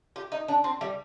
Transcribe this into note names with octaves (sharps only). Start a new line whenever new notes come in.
G4
D#4
D4
C4
G3